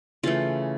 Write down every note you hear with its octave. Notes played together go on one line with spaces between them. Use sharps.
C#3 E3 A3 F4